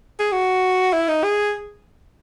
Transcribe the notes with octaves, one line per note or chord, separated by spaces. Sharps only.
G#4
F#4
E4
D#4
G#4